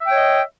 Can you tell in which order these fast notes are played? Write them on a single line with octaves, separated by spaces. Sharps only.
E5 G5 C#5 D#5